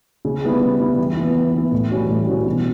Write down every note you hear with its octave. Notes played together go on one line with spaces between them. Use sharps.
C#3
G3 B3 E4
C#3
G3 B3 E4
E3
B3 E4
E3
B3 E4
A2
E3 G3 C#4 F#4
A2
E3 G3 C#4 F#4
B2